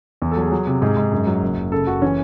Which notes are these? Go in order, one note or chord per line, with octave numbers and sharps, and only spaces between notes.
E2
A4
F#3
G#4
F#3
C3
G#2 G#4
G#2
F#2
F#3
F#1
F#1
C#3 A4
F#1 F#4
E3 C#4